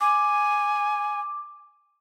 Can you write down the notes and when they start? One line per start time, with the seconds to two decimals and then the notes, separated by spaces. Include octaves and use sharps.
0.01 G#5 D6